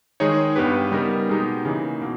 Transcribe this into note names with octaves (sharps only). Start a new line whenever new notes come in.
D#3 G#3 D#4 G#4 C#5
G2 G3 B3 G4 B4
C#3 G3 B3 D#4 A#4
B2 G#3 B3 D#4 G4
C#3 E3 A#3 D#4
B2 A#3